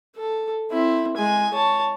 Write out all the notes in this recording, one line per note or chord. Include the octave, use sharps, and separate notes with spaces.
A4
C4 E4
G#3 G#5
C#5 A5